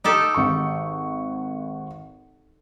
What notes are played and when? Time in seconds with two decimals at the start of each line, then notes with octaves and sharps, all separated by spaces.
0.04 D#4 G4 A4
0.34 G#1 C#6